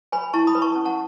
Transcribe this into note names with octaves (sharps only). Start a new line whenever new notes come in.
B4 G#5 B5
E4 A5 C#6
B5 D#6
B4
A5 C#6
C#4
F#5 A5